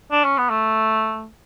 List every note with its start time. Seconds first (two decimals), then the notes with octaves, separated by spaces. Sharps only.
0.12 D4
0.25 C#4
0.38 B3
0.50 A3